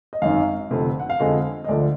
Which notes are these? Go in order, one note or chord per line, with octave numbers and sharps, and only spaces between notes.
D#5
G#1 F#2 D#3 F5
F1 F2 D3
F#5
F5
F2 D3 G#3 D#5
D#5
D2 D3 F3 D5